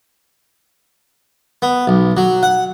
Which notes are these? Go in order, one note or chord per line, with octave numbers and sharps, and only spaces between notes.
B3
B1
F#3
F#5